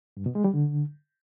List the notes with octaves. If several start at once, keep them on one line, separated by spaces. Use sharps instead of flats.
G2
B2
G#3
G3
D3